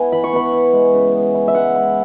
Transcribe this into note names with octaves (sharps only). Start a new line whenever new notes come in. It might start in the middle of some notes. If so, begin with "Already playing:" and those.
Already playing: B3 E4 F#5 G#5
E3 B5
C#6
B3 B5
E4
G#3
C#3
B3
E4
E5
G#3 F#5
E4